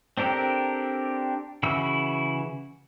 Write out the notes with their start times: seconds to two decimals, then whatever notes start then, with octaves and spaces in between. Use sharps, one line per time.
0.17 C4 D4 G4 A4 A#4
1.63 C#3 E3 E4 F#4 E6